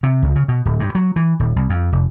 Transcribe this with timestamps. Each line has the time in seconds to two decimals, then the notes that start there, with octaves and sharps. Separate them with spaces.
0.03 C3
0.23 C#2
0.35 C#3
0.48 B2
0.65 D1
0.80 G2
0.95 F#3
1.16 E3
1.40 D#1
1.56 C2
1.70 F2
1.92 F1